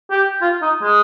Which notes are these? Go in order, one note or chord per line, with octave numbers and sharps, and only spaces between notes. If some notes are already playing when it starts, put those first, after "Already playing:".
G4
F4
D#4
G#3